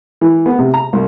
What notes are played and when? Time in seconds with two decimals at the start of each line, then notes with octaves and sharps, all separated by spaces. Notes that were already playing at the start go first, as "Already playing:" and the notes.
0.21 E3
0.46 B3
0.59 C3
0.74 A#5
0.93 C2